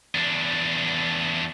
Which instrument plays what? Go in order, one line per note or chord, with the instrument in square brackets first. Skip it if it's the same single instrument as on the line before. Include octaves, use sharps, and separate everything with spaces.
[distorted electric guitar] E2 D4